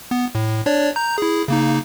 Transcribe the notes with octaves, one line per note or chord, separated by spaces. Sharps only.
B3
A2
D4 C#5 D5
A#5 G6
E4 G#4
C#3 A#3 D#4